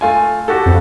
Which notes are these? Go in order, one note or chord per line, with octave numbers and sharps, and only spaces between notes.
A3 F4 G#5
F#4 G4 A4
F2